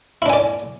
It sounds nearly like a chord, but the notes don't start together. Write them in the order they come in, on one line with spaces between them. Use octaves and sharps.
E4 D4 G#5 D5